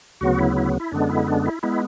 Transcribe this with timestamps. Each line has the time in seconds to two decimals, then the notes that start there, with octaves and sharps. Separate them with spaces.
0.21 D2 C#3 F#3 B3 F#4
0.39 E4
0.57 E4
0.80 E4
0.92 F#2 D3 G#3 B3 D4
1.10 E4
1.28 D4
1.46 E4
1.63 G#3 B3 E4